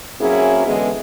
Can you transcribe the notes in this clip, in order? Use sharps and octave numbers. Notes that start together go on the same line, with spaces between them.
F#3 A#3 C4 C#4 E4 G#4
D3 E3 G#3 B3